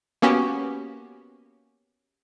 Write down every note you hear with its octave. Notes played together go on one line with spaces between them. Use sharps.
A#3 B3 C#4 F#4 G4